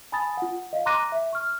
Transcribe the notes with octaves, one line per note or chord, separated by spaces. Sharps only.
G#5 A5 B5 D#6 A6
F4 F#5
D#5 F5
A#5 C6 D6 F#6 A#6 D#7
E5
C#6 F6